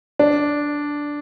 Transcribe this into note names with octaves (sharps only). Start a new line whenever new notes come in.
D4